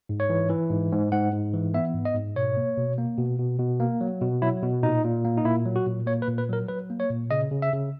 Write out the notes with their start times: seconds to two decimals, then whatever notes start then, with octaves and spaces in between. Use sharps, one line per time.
0.09 G#2
0.20 C#5
0.30 E3
0.50 E3
0.70 G#2
0.92 G#2
1.12 G#2 F#5
1.32 G#2
1.54 E3
1.74 B3 E5
1.94 G#2
2.05 D#5
2.15 G#2
2.36 B2 C#5
2.57 A#3
2.78 B2
2.98 A#3
3.18 B2
3.39 B2
3.59 B2
3.80 A#3
4.01 F#3
4.21 B2
4.42 F#3 E4
4.63 B2
4.83 A#2 D#4
5.04 A#2
5.25 A#3
5.37 D#4
5.45 A#2 E4
5.66 F#3
5.76 F#4
5.87 A#2
6.07 A#3 C#5
6.22 B4
6.28 A#2
6.38 B4
6.49 F#3 A#4
6.68 F#3 B4
6.90 A#3
7.00 C#5
7.10 A#2
7.31 C#3 D#5
7.52 C#3
7.62 E5
7.73 C#3